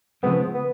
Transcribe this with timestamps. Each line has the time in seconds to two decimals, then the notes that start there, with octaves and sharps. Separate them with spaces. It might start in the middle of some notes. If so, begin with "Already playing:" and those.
0.23 C#3 F3 G#3 B3 C4
0.54 B3